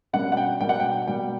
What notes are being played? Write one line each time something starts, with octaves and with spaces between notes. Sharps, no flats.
B2 G3 A#3 C#4 F#5
F#5
G5
B2 G3 A#3 G5
F#5
G5
B2 G3 A#3 G5